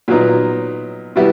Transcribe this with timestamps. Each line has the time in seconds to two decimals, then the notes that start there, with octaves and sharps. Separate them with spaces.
0.08 A#2 F#3 B3 D#4
1.16 B2 G3 B3 E4